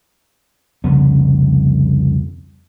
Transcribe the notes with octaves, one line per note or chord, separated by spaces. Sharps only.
C2 F2 C#3 B3